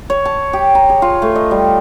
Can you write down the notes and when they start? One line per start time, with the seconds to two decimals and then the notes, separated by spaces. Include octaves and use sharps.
0.10 C#5
0.25 A5
0.53 G4
0.75 A#5
0.89 G#4
1.02 F4
1.22 A3
1.35 D#5
1.51 G3